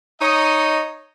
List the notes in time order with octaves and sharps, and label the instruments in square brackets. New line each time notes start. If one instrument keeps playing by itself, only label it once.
[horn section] D#4 C#5 D#5